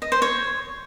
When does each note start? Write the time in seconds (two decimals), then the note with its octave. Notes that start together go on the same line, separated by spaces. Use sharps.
0.02 D#5
0.12 C5
0.22 C#5